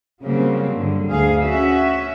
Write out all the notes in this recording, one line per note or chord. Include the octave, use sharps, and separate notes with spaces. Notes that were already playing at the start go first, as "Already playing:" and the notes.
C#3 F#3 G3 A#3 C4
G2 D3
D2 G#4 F5
C#4 F#4 E5